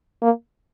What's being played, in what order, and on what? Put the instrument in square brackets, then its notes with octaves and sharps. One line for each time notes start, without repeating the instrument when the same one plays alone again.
[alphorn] A#3